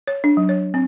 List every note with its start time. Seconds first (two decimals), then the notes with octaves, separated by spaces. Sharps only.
0.07 C#5
0.24 D4
0.37 F#3
0.49 C#5
0.74 C4